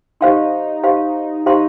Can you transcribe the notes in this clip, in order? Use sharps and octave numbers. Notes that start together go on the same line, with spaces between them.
D#4 G4 C5 F5 C6
G4 C5 F5 C6
D#4 G4 C5 F5 C6